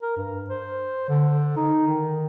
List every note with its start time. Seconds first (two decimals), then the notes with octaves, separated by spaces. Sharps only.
0.02 A#4
0.17 G2
0.50 C5
1.09 D3
1.57 D#4
1.87 D#3